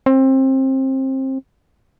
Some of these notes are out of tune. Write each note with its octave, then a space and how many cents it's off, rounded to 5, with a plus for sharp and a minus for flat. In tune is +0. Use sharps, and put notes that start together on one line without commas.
C4 +25